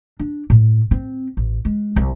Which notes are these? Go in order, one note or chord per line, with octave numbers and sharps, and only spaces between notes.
D4
A2
C4
A1
G#3
C2